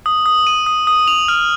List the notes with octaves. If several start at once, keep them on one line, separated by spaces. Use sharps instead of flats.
D#6
D#6
D#7
D#6
D#6
F7
F6